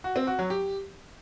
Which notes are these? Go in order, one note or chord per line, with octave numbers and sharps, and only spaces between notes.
F#4
C4
F#4
F#3
G4